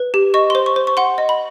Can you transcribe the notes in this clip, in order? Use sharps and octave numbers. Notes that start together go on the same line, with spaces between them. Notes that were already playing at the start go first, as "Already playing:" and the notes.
Already playing: B4
G4
D#5 C#6
C5 C6
C#6
C5
C#6
F#5 C6
D#5
B5